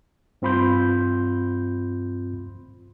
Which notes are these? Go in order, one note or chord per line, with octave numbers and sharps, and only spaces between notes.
G2 C4 F4 B5 C6 G6